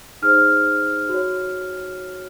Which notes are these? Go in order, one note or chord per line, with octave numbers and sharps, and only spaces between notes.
D#4 G#4 C5 F6
F#4
C#5